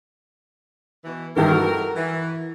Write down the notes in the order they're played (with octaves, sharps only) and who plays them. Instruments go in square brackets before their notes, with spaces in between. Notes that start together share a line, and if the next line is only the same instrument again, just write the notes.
[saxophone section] B2 E3
[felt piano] G2 D#3 E3 [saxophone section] A#4
[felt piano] F#4 A4
[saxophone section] E3